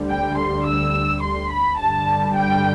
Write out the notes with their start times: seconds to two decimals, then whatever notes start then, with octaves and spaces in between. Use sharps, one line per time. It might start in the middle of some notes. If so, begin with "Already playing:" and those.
Already playing: D2 D3 G3
0.09 G5
0.37 C6
0.66 E6
1.22 C6
1.51 B5
1.79 G2 D3 G3 A5
2.36 G5